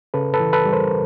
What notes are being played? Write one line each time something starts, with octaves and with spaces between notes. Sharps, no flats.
C#3 A4 B4
A4 B4
E3
A4 B4
G3
A#4 C5